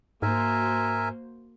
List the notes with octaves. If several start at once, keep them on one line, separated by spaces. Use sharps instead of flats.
G#2 A#3 F#4 A#4 C5 E5 G#5